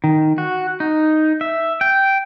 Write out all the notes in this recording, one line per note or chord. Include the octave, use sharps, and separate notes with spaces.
D#3
F#4
D#4
E5
G5